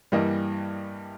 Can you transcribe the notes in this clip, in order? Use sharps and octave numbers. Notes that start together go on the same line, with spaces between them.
G2 E3 G3 A#3 D#5